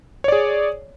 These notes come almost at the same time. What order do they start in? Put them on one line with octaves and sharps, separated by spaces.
C#5 D5 G#4